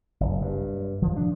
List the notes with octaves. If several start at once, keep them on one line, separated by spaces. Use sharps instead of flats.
F#1
G2
F3
D4